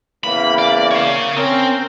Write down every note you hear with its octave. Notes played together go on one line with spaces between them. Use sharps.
E2 C#3 A#3 B5
D5
C#5 F5
C4 C#4 A#4